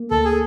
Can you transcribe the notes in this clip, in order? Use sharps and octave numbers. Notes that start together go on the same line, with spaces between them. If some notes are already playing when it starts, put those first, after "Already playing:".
Already playing: A#3
D2 A4
G#4